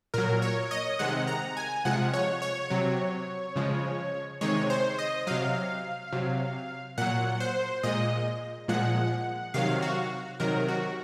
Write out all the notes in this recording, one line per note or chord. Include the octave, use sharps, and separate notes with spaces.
A#2 F#3 A#4
C#5
D#5
C3 D#3 G#3 F#5
A#5
G#5
C3 F3 G#3 F#5
C#5
C#5
C3 F#3
C#3 F3 G#3
C3 D#3 G#3 C#5
C5
D#5
C3 F#3 F5
C3 F#3
A#2 F#3 F#5
C5
A#2 G#3 D#5
A#2 F3 G#3 F#5
C3 D#3 F#3 F5
F#4
C3 D#3 F#3 A#4
F#4